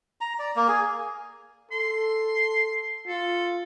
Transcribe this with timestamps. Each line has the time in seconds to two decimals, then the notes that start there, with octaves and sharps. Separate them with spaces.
0.21 A#5
0.39 D5
0.56 A#3
0.68 G#4
1.72 A4 C6
3.08 F4 A4